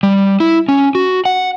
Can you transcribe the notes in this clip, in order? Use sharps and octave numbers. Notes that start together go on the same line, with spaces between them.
G3
E4
C#4
F#4
F#5